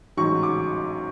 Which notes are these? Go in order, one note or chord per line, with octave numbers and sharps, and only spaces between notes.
A1 G#2 F#3 C#6
D6